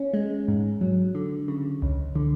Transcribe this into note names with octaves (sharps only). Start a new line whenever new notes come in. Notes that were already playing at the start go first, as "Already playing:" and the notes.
Already playing: C#4
G#3
G#2
F#3
D3
C#3
C#2
D3